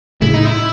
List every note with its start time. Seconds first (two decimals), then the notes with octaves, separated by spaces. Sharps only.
0.21 A2 C#3 E4
0.33 D#4
0.45 E4